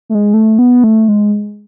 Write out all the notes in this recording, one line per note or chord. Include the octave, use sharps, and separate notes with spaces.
A3
G#3
A3
B3
A3
G#3